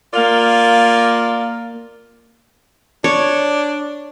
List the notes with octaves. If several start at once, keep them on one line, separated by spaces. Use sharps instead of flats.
A#3 F4 D5 F5
D4 C#5